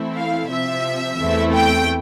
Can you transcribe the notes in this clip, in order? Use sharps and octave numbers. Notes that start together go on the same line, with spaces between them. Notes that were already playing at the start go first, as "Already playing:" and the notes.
Already playing: E3 A3 C4 E4
F5
C3 F3 C4 E5
E2 E3 A3 C4 E4
G5